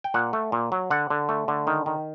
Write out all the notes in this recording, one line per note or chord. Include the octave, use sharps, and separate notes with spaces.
G5
A#2 F#5
A3
A#2
F#3
D3 F#5
D3
A3
D3
D#3
D#3